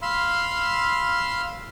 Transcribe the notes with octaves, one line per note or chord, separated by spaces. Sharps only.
F5 B5 C6 E6 F6